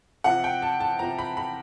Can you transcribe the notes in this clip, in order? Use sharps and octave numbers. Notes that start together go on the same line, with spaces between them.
C3 F3 F#5
G5
A5
A5
C3 F3 A#5
B5
B5